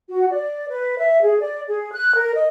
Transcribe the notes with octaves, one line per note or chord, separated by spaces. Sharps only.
F#4
D5
B4
E5
G#4
D5
G#4
F#6
A#4
D#5